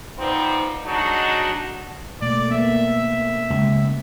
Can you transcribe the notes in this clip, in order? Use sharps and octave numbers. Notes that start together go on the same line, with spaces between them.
F3 G3 B3 C4 D#4
F#3 G#3 D4 D#4 F#4
B2 A3 A#3 D5
A#3 B3 E5
C#2